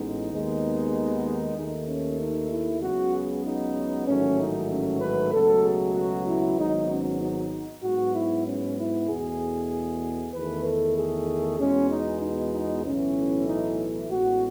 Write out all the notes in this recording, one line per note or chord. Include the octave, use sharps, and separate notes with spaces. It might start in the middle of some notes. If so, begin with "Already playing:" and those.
Already playing: A1 A2 G#3 B3 D#4
D#2 D#3 G#3 B3
D#2 D#3 A3 D#4
C#4
D#4
E4
C#2 C#3 F#3 B3 F#4
G#4
D#4
A1 G#2 D#3 F#3 A3 C#4
D#4
C#4
B4
C#2 B2 F#3 A3 A4
G#4
F#4
E4
G#1 G#2 F#3 B3 D#4
C#4
D#4
G#2 F#3 B3 F#4
E4
C#4
E4
E2 B2 A3 G#4
E2 D#3 A3 B4
A4
G#4
E2 B2 G#3 B3 C#4
D#4
D#4
D#4
B1 A2 E3 A3 C#4
D#4
A1 A2 G#3 B3 F#4